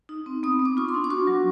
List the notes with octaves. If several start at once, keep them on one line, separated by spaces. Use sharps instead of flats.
D#4
C4
B3 D#6
B3
D6
F4 C#6
C6
D4
D6
F#4 C#6
F#3